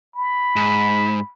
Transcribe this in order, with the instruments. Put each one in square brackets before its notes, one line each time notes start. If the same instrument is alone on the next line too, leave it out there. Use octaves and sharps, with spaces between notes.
[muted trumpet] B5
[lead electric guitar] G#2